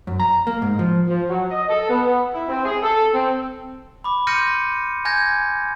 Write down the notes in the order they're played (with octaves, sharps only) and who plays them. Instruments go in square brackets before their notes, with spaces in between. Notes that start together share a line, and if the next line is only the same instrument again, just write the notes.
[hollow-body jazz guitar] F#2
A#5
A#3
G#2
F3
[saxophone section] F3
F#3
D#5
A4
B3
E4
C4
G#4
A4
C4
[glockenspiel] B5 D6
C6 F6 G6 A#6 C#7 D#7
G#5 F6 G6 G#6 A#6